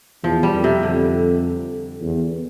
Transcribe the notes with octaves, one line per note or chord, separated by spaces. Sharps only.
E2 F3
G3
F2
C3
F2 D3
E2